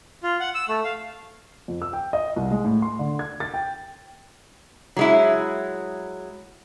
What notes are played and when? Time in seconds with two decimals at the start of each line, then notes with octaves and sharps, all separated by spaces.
0.23 F4
0.40 F#5
0.55 E6
0.69 A3
0.84 F5
1.68 F2
1.82 E6
1.93 G5
2.13 D#5
2.36 C2
2.51 G#3
2.65 A2
2.82 C6
2.99 D3
3.19 G#6
3.40 A6
3.54 G5
4.97 F#3 G#3 E4